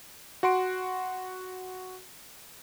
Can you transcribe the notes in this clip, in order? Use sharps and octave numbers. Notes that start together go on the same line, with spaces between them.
F#4 F#5 C6 D7